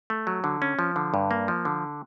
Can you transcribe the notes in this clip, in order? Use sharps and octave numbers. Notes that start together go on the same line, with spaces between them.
A3
F#3
D3
C#4
F3
D3
G2
A#3
F3
D3